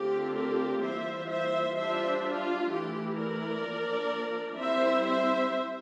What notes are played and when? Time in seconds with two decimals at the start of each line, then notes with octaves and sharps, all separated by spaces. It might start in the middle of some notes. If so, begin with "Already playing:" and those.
Already playing: D3 A3 C4 F4 G4
0.34 G4 A#4
0.81 E3 G3 A#3 F4 C5 E5
1.28 C5 E5
1.76 G3 D4 F4 C5 E5
2.23 F4
2.70 E3 A3 E4 G4
3.17 A#4 D5
3.64 F3 A#3 D4
4.59 G3 C4 E4 C5 E5
5.06 C5 E5